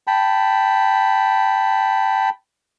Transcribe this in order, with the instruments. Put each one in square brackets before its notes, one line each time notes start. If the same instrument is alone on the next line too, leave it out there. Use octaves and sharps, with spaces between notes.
[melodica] G5 A5 B5